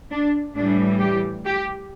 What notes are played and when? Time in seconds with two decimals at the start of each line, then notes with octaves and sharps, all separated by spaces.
0.10 D4
0.55 A2 E3 G3 D4
1.00 G4
1.45 G4